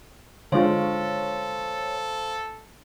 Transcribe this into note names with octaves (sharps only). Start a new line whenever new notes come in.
D3 G#3 F4 A4 C5 C#5 F5 C6